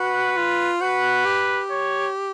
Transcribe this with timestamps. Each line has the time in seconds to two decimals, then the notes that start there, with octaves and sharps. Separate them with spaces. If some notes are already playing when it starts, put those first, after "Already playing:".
Already playing: F#4 B4
0.37 F4
0.81 F#4 B4
1.25 G4
1.70 C#5